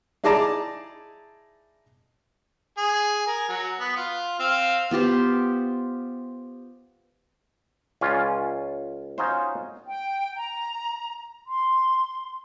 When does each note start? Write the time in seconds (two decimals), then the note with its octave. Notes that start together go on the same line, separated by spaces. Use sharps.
0.24 D#4 E4 G#4 D5 A5 A#5
2.78 G#4
3.27 A#4 G#5
3.49 F#3
3.80 B3
3.96 F4
4.39 C4 F5
4.91 B3 F4 G4 C5
8.01 C#2 C#4 F4 D5
9.18 C#4 D#4 F4 F#4 C5
9.87 G5
10.36 A#5
11.46 C6